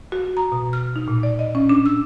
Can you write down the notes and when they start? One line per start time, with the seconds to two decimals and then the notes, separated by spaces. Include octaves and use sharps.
0.12 F#4
0.37 A#5
0.52 B2
0.73 F6
0.96 D#4
1.08 A#2
1.23 D5
1.39 D#5
1.55 C#4
1.69 D4
1.86 E6